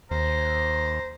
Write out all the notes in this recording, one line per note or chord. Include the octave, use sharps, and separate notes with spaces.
D#2 C5 A#5